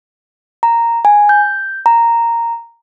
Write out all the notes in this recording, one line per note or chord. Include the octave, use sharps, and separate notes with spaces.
A#5
G#5
G6
A#5